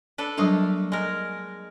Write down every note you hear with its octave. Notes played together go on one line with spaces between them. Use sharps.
D4 A4 B4
F#3 G3 A3 A#3 D4 F5
G#3 A#4